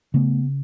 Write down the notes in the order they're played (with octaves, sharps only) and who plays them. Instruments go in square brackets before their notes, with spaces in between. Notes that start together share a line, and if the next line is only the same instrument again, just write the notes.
[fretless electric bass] C#3 A3 B3